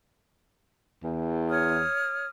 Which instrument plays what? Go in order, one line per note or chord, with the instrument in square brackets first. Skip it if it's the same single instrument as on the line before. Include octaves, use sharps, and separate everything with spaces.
[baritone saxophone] E2
[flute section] C#5 D#6 F6